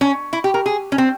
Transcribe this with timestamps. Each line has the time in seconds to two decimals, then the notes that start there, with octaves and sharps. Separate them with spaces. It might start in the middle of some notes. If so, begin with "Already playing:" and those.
0.01 C#4
0.33 E4
0.44 G4
0.54 A#4
0.66 G#4
0.92 C#4
0.98 C4